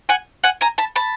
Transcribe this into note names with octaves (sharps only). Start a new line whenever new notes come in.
F#5 G#5
F#5 G#5
G#5 A#5
A5 B5
A5 B5